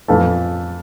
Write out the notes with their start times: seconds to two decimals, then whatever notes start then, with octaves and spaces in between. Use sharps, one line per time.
0.08 F2 E3 A3